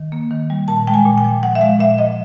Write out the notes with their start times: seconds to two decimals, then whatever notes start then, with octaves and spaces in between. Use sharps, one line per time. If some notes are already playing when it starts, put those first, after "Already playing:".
Already playing: D#3
0.12 A#3
0.31 D#3
0.50 G3
0.68 A#2 A5
0.87 G#3 G5
0.94 G#5
1.05 A#2
1.18 G5
1.24 F3
1.42 A#2 F#5
1.55 E5
1.61 G#3 F5
1.79 A#2 E5
1.98 F3 D#5